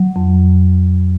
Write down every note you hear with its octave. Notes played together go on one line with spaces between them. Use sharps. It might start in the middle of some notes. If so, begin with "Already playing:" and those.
Already playing: F#3
F2